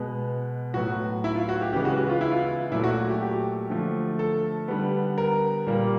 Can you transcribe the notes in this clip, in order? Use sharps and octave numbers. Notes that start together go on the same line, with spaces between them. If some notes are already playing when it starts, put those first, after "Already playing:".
Already playing: B2 G#3 B3
A2 F#3 B3 F#4
E4
F4
F#4
G4
C#3 E3 G#3 B3 G4
F#4
F#4
F4
E4
F4
A#2 F#3 A3 E4
F#4
G4
G4
D3 F3 A3
A4
D3 G3 B3
A#4
A#2 G3 A#3